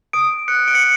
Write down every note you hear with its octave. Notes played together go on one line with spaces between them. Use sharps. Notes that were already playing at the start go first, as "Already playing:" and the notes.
D#6 D7
F#6 C#7
D7
C#7